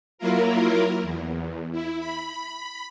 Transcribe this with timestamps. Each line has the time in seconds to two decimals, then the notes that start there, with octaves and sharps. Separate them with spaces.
0.18 F#3 A#3 E4 F4 A#4
1.02 E2
1.72 E4
2.00 B5